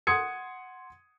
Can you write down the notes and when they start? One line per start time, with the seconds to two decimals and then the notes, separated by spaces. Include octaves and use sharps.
0.07 F#5 C6 D#6 G#6 C#7